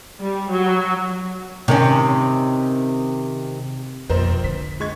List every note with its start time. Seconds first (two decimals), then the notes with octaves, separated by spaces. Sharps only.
0.21 G3
0.51 F#3
1.68 C3 D#3 C#4
4.10 E1 A#1 F2 A#4 C5
4.44 D3 B6
4.80 G#3 C#6 G#6